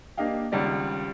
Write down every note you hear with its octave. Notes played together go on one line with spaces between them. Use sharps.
A#3 D4 G4 D#5 F5 G5
G#1 C#2 G3 D5